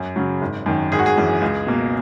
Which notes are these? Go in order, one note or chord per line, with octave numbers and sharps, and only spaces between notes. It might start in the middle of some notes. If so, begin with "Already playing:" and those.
Already playing: F#2
C#3 F#3
G#1
F#2 D#3
G#1 G#4
F#4
G#4
F#2 E3
C#2
B2 A#3